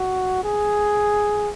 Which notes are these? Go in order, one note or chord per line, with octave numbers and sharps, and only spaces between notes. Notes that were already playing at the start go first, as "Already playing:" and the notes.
Already playing: F#4
G#4